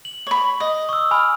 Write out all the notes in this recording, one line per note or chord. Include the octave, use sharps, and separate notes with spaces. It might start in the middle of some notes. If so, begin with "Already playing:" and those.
F#7
C#5 B5
D#5 D#6
C#6 E6
G#5 B5 F6